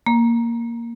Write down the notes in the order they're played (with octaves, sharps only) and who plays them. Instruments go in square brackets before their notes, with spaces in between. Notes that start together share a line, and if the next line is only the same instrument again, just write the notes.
[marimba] A#3